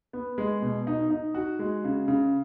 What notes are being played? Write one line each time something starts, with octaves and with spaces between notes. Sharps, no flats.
B3
G#3
B2
D#4
D#4
F#4
G#3
C#3
C#3